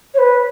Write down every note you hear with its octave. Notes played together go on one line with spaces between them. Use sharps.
C#5
B4